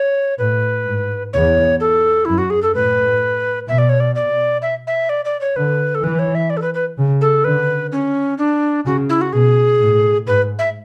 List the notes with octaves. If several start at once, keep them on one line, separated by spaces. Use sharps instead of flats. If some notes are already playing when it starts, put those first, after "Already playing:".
Already playing: C#5
A2 B4
G#2
E2 C#5
A4
F#2 E4
F#4
G#4
A4
A2 B4
B2 E5
D5
C#5
D5
D5
E5
E5
D5
D5
C#5
D3 B4
A4
E3 B4
C#5
E5
D5
A4
B4
B4
C#3
A4
D3 B4
C#4
D4
C#3 F#4
E4
F#4
B2 G#4
A2
G#2 B4
E5